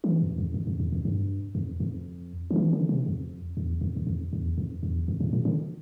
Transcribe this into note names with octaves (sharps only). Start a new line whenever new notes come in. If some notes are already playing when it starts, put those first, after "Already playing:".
E3
F2
F2
F2
F2
E2
F2
G2
F2
F2
D3
E3
D3
C3
F2
E2
F2
E2
F2
E2
F2
E2
F2
A2
A#2
D3